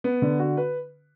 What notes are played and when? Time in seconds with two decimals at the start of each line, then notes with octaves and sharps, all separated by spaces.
0.04 B3
0.22 D3
0.39 F#4
0.57 B4